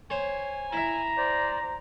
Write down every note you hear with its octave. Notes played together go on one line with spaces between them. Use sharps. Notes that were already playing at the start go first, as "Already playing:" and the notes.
C5 C#5 G#5
E4 E5 A#5
C5 D5